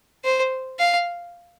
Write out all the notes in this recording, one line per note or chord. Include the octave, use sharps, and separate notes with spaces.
C5
F5